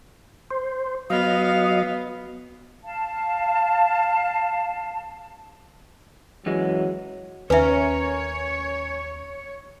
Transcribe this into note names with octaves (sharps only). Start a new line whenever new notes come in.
C5
F#3 B3 D#5 F5
F5 A5
F#2 E3 F#3 G#3
D#2 C#4 A#4 B4 C#5 E5